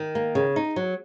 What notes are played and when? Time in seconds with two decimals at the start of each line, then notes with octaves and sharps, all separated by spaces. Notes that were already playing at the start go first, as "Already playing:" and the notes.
Already playing: D#3
0.15 A#3
0.35 C#3
0.56 D#4
0.76 F#3